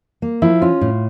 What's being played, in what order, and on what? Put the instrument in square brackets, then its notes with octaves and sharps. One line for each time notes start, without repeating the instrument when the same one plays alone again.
[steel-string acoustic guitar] A#3
[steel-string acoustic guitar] F3 [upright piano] E4
[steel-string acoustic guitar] C#4 [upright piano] F4
[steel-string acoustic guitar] A2